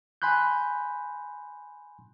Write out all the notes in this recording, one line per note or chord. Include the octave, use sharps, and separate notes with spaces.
G#5 B5 C6 F#6 G6